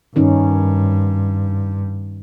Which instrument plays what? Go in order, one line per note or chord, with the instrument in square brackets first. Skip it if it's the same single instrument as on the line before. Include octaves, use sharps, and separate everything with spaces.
[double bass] G2 [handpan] D#3 C#4 D#4